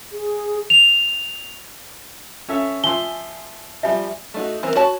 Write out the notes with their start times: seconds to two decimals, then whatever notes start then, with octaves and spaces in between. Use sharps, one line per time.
0.12 G#4
0.70 F7
2.49 C#4 A4 E5
2.84 F3 E5 G#5 C6 G7
3.83 F3 G3 E5 G#5
4.34 A3 D#4 F#4
4.63 E3 C4 A#4
4.75 F#4 C#5 A5